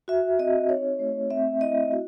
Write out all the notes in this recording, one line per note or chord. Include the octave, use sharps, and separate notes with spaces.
F#4 E5
C4 D#5
D#4 C#5
A3
C4 E5
E4 D#5
F#4